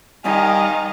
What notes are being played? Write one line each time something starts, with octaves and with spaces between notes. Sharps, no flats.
D#3 G3 D#5 F5 G#5